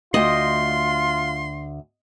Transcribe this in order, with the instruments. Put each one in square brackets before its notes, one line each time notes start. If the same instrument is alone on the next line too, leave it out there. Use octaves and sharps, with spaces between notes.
[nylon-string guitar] D2 G5 [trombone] F4 [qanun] D#5 [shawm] C6